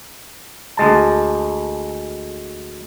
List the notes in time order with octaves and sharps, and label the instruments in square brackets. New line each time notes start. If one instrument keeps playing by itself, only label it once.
[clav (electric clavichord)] D2 G#3 A5